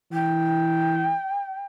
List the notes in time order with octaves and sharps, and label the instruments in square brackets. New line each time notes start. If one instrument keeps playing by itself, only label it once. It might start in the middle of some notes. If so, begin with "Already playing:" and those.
[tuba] E3 [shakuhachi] G5